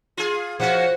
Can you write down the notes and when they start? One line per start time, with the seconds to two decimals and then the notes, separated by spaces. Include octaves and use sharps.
0.17 F4 G#4
0.60 F3 A#3 C#4 F#4 F#5